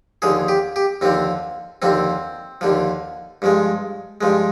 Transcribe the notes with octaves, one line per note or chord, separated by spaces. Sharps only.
D#2 D3 F3 G#4
G4
G4
D#2 D3 F3 C4
D#2 D3 F3 C4
D#2 D3 F3
G2 F3 G#3
G2 F3 G#3